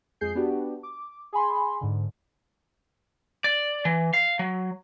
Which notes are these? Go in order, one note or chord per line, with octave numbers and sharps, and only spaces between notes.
F2 G#3 G#4 G6 C7
B3 D4 F#4 G4
D6
G#4 G#5 B5 C6
G#2 D3
D5
E3
F5
F#3